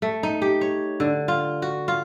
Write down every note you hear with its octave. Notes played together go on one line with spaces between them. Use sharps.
A3
D#4
G4
C#5
D3
F4
F#4
F4